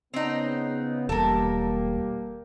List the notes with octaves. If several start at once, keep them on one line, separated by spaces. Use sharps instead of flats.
C#3 B3 C4 D#4
E1 G3 A#3 G4 A4 A#4